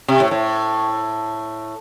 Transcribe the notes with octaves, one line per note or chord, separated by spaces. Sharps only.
C3
A2
A2